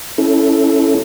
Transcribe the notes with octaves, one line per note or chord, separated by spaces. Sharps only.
C#4 E4 A4